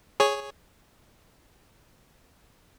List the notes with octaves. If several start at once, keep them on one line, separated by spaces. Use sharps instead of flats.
G#4 C#5